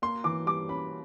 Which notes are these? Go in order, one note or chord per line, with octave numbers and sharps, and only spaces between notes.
A#3 C6
E3 D6
G3 D6
C#4 B5